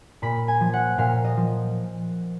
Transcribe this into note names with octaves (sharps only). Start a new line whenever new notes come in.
A#2 B5
G#5
F3
F#5
A#2 F5
D#5
F3